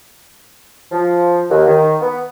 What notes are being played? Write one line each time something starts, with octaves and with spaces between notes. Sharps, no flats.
F3
D#2
D#3
B3